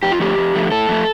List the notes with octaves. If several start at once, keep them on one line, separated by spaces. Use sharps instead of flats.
F2 G4
F4
D3 F3 A3 G4
F2
D3 F3 A3
A2 A4
F3 A3